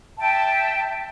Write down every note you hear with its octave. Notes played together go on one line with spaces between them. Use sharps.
E5 G5 A5